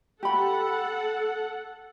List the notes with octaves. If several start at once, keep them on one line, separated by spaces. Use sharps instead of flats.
G4 A4 F#5 B5